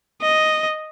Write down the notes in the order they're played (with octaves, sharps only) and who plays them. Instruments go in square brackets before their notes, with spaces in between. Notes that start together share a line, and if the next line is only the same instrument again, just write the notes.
[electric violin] D#5